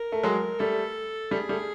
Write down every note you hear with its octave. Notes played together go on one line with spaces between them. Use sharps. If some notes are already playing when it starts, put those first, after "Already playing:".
Already playing: A#4
A3
F#3 G#3
G3 A3 A4
G3 A3 G#4
G3 A3